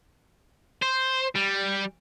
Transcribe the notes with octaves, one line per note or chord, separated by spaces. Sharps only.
C5
G3